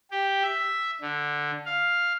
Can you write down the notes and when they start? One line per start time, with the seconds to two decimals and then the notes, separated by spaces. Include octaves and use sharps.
0.11 G4
0.43 E5
1.01 D3
1.66 F5